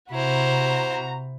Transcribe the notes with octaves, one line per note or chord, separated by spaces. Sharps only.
C3 E4 F#4 C5 A#5